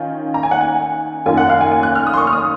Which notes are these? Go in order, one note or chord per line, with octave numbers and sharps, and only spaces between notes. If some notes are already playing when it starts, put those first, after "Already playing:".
Already playing: D#3 C#4 F4 G#5
A#5
G#5
F#5
G#5
F#2 D#3 A#3 F4 G#5
F#5
F5
G#5
G#5
F#6
F6
D#6
C6
C#6
F6
D#6